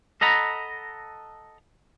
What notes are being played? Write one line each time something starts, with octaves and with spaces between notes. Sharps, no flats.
A4 D#5 F#5 A#5 B5